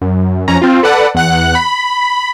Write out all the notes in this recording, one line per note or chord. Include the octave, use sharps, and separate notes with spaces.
F#2
F2 C#4 A#5
C4 F4
A4 B4 D5 F#5
E2 F#5 F#6
B5